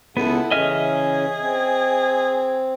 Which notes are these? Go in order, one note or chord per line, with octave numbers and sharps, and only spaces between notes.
C#2 B3 E4 A4 F#5
C#3 E3 C#4 G#4 D#5 E5 F6
C4